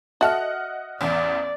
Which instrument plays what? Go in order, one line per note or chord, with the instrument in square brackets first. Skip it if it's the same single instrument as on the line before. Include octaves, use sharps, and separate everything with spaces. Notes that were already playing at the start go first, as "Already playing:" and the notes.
[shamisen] F#4 A4 [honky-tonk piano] D#5 F#5 F6 [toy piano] E5
[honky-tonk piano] A1 E2 [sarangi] D5